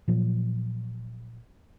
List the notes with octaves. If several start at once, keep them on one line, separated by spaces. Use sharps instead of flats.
A#2 F3 F#3